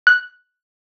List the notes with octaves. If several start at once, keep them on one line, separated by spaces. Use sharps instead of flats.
F#6